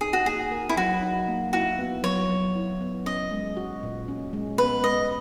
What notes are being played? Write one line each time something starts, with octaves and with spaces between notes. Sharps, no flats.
D#4 G#4
F#4
A#3 G#4
A#4
E4
F#3 F#4
D#4
A#3
E4 F#4
B3
F#3 C#5
F#3
E4
B3
C#4 D#5
G#3
F#4
A#2
C#4
G#3
B3 B4
G#3 D#5